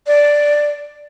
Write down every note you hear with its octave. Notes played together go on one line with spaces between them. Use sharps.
D5